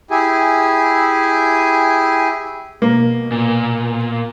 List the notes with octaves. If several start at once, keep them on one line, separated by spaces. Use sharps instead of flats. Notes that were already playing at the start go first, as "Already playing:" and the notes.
E4 G4 G#4 G#5
B2 A#3
A#2